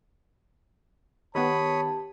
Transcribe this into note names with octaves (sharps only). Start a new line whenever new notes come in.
D#3 B3 G4 B4 C#5 A5 B5 D#6